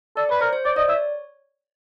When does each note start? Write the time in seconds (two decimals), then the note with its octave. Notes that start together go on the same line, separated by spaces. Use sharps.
0.17 A4 D5
0.29 B4 C#5
0.41 A#4 C5
0.53 C5
0.65 C#5 D5
0.76 D5 D#5
0.89 C#5 E5